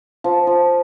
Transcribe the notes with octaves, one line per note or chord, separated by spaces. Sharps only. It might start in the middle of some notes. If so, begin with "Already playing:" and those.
F3
F3